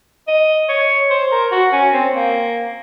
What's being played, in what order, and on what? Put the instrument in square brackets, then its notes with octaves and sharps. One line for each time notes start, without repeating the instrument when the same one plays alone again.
[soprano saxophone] D#5
C#5
C5
A#4
F#4
C#4
C4
A#3